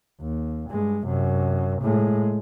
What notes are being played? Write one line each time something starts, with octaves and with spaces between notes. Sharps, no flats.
D#2
G2 G#3
F#2 C3
A2 G#3